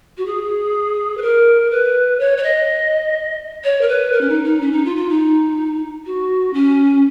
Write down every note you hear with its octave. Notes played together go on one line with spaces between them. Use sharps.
F#4
G#4
B4
A#4
B4
C#5
C#5
D#5
C#5
A#4
B4
A#4
C#4
D#4
D#4
C#4
D#4
F4
F4
D#4
F#4
C#4